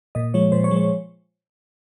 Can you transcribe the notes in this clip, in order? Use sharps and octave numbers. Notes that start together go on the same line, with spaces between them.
A#2 D#5
F3 G#3 C#5
A#2 C5
C#5
F3 G#3
C#5